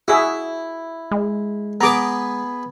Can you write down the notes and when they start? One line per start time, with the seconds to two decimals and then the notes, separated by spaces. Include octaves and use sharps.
0.08 E4 F#4 G#4 E5
1.11 G#3
1.81 B3 G#4 B4 A#5 D6